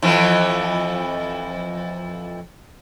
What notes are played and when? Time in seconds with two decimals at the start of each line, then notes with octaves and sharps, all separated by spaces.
0.02 F2 E3 F3